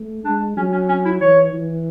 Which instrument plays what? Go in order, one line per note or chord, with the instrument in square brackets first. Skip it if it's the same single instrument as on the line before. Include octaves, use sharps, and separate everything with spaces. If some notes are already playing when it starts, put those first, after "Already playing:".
Already playing: [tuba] A3
[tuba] G#3 [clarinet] D4
[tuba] F#3 [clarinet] C#4
[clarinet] C#4
C#4
E4
[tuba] E3 [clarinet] C#5
[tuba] E3